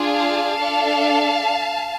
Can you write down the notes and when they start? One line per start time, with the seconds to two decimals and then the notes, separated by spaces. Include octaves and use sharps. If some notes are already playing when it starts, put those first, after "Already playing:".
Already playing: D4 F4 G#4
0.15 F5 A5
0.59 D4 A4